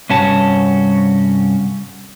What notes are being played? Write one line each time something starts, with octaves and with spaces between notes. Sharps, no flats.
C2 G2 C#4 F#4 A5